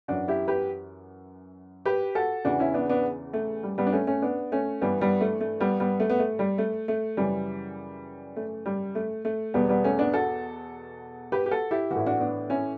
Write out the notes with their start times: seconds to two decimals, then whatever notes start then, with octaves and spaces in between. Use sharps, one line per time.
0.08 F#2 E3 D4 F#4
0.28 E4 G4
0.48 G4 B4
1.85 G4 B4
2.15 F#4 A4
2.45 E2 C#3 E3 D4 F#4
2.59 C#4 E4
2.74 B3 D4
2.89 B3 D4
3.33 A3
3.63 G3
3.78 G3 B3
3.86 D4
3.92 A3 C#4
4.07 A3 C#4
4.22 B3 D4
4.52 A3 C#4
4.81 G2 E3 G3 B3
5.01 G3 B3
5.21 A3
5.41 A3
5.60 G3 B3
5.80 G3 B3
6.00 A3
6.10 B3
6.19 A3
6.39 G3
6.58 A3
6.88 A3
7.17 F#2 C#3 E3 G3
8.36 A3
8.66 G3
8.95 A3
9.25 A3
9.54 E2 B2 G3 B3
9.69 G3 B3
9.84 A3 C#4
9.99 B3 D4
10.13 F#4 A4
11.32 G4 B4
11.46 G4
11.51 F#4 A4
11.71 E4 G4
11.91 E3 F#4
11.96 A2 E4
12.06 D4 F#4
12.20 B3 D4
12.50 C#4 E4